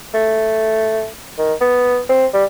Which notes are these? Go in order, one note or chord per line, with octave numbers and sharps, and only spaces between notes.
A3
D#3
B3
C4
G3